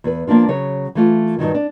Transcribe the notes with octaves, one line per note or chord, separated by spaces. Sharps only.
E2 B4
F3 A#3 B3 D4 F4
C#3 F#3 C#5
E3 A3 F4
G2 C3 D#3 F#3
D4